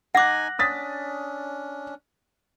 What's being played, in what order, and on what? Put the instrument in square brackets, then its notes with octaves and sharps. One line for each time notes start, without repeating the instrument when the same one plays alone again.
[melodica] D#4 G#5 [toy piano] F#5 D6 [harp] F#6 A#6
[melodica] C#4 D4 [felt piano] D#6 A6 B6